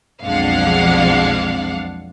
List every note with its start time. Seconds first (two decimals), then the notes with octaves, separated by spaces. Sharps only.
0.23 B1 F2 G#3 D4 F5 F#5